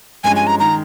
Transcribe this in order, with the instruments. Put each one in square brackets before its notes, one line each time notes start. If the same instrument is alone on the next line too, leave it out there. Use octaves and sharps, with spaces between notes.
[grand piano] G2 F3 G#3 C#4 [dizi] G#5
[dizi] G#5
A#5
[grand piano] D#3 G#3 [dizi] A#5